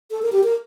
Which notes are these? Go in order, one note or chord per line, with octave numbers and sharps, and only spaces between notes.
A4
A#4
G4
A#4